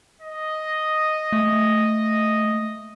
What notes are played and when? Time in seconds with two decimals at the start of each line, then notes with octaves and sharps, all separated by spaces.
0.21 D#5
1.32 A3